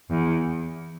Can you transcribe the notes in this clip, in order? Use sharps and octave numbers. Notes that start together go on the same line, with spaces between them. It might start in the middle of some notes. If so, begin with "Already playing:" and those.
E2